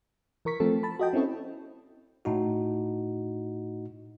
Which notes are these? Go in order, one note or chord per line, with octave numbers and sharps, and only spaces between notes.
E3 A#4 C#6 B6
F3 A3 C4 A4
A5 B5
F#4 D#5 G5
C4 C#4 E4 A4 C#5
A2 D#4 F#4